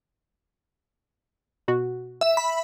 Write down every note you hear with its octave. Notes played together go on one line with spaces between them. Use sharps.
B2 F#4
E5
B5